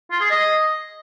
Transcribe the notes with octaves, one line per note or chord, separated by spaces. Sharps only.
F4
G#4
D#5